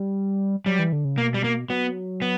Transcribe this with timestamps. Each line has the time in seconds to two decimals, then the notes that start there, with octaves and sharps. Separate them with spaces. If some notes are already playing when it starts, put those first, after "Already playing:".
Already playing: G3
0.66 F#3 G3
0.79 E3
0.93 D3
1.05 C#3
1.18 B2 A#3
1.34 G3
1.44 A#3
1.69 F#3 B3
2.22 B3